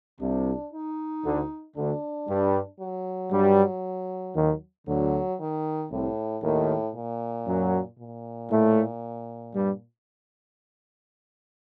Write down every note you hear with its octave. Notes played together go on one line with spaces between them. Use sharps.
C2 C3 D4
D#4
D2 D3
D2 D3 D4
G2 G3
F#3
G2 G3
D#2 D#3
D2 D3 F#3
D#3
C2 A2 C3
D#2 A2 D#3
A#2
F#2 F#3
A#2
A2 A3
G2 G3